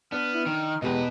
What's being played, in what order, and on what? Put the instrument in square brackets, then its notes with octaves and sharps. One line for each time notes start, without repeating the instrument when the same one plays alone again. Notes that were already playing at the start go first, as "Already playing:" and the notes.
[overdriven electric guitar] B3 [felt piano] D4 [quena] F6
[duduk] E4
[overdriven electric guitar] D#3 [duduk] D#4
[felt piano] E2 G4 D#5 [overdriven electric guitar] B2 B4 [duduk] G#3